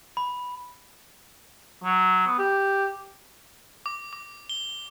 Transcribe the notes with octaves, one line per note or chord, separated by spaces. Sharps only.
B5
F#3
B3
G4
D6
D6
G7